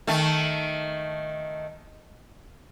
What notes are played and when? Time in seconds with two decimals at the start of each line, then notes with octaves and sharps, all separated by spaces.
0.07 D#3 A3